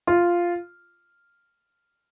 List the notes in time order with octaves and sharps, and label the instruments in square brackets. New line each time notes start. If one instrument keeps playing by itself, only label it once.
[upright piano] F4